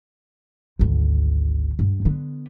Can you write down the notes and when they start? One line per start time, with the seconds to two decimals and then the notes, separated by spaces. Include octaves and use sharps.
0.79 G#1 D2
1.79 G2
2.05 D3 B3